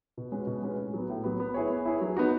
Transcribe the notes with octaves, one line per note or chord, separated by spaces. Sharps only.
B2
G#3 C#4 F#4 B4
B2
G#3 C#4 F#4 B4
A2
F#3 B3
A2
F#3 B3
B3
E4 G#4 C#5
B3
E4 G#4 C#5
F#3
B3 D#4 F#4